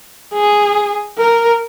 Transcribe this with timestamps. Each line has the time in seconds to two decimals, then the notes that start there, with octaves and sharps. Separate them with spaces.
0.33 G#4
1.18 A#4